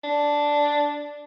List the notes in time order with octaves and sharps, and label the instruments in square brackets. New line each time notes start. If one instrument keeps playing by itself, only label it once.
[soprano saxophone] D4